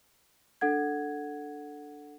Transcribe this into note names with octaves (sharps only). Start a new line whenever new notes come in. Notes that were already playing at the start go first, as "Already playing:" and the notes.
D4 A4 F#5 G#6